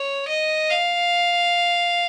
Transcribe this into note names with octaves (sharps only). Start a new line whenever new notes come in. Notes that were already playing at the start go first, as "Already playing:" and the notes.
Already playing: C#5
D#5
F5